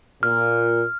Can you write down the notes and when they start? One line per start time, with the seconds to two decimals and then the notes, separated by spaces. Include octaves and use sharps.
0.23 A#2 F6